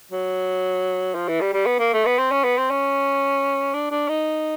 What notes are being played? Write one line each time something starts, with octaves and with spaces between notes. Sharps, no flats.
F#3
F3
E3
G3
G3
B3
A#3
A3
B3
C4
C#4
B3
C4
C#4
D4
D4
D#4